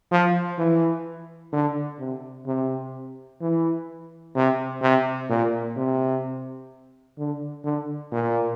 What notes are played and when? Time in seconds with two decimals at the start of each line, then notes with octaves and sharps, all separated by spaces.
0.11 F3
0.58 E3
1.52 D3
1.99 C3
2.46 C3
3.41 E3
4.35 C3
4.82 C3
5.29 A#2
5.76 C3
7.18 D3
7.64 D3
8.12 A#2